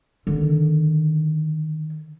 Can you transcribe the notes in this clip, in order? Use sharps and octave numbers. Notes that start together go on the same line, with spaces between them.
D3 D#3